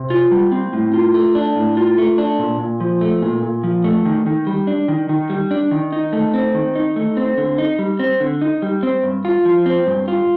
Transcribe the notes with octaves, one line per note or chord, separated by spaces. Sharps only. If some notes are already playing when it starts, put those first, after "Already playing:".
Already playing: C3
F4
G3
C4
A2
F4
A3
D4
A2
F4
A3
D4
A#2
A#2
F3
A3
A#2
A#2
F3
A3
D#3
D#3
G3
D4
D#3
D#3
G3
D4
D#3
D#4
A3
C4
D#3
D#4
A3
C4
D3
D#4
G3
C4
D3
D#4
G3
C4
G2
F4
F3
C4
G2
F4